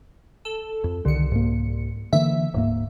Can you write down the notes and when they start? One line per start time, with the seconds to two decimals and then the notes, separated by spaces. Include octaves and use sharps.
0.45 A4
0.84 F2
1.05 C2 D3 D#3 C#7
1.32 G#2 A#3
2.13 D3 E3 A#3 E5
2.54 D1 G#2 A#3